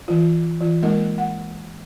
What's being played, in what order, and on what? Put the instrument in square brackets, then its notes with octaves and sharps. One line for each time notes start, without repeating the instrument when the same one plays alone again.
[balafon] E3 F4
E3 F4
G#3 A#3 D#4 A#4 D#5
F#5